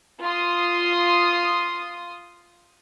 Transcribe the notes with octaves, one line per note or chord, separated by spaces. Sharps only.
F4 C6 D#6